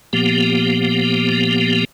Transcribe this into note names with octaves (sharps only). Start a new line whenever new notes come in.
A#2 F3 A#3 B3 G4